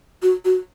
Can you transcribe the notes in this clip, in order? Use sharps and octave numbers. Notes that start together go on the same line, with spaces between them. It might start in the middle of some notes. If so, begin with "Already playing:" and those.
F#4
F#4